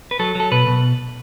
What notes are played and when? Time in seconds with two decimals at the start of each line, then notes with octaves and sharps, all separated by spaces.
0.11 B4
0.19 F#3 A4
0.35 F#3 A4
0.51 B2 B4
0.67 B2